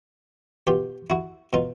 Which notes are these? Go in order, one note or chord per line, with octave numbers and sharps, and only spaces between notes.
B2 F4 G4
E4 F#4
B2 D#4 F4